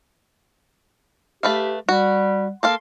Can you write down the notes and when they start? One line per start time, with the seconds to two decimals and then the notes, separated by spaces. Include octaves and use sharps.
1.43 A3 G4 B4 F5
1.89 G3 F#4
2.63 A#3 A4 F5 C6